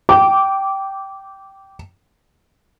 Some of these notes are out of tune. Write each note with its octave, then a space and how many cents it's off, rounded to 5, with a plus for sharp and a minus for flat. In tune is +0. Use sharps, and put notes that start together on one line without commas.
G5 -10 D6 -15